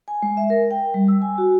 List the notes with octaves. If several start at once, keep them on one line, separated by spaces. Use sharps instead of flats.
G#5
G#3
E5
A#4
G5
G3
E6
G#5
F#4